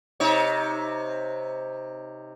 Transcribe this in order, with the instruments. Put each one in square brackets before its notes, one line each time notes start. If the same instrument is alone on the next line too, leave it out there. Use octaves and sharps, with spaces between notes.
[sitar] C3 D#4 C#5